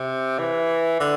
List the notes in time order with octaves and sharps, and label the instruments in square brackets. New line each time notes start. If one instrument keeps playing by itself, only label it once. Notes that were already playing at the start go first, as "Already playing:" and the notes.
Already playing: [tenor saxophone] C3
E3
D3